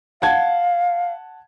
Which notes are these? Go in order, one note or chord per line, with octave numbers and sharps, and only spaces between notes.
F5 F#5 A5 G#6